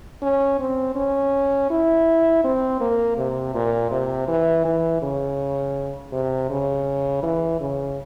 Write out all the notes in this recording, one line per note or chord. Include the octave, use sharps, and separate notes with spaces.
C#4
C4
C#4
E4
C4
A#3
C3
A#2
C3
E3
E3
C#3
C3
C#3
E3
C#3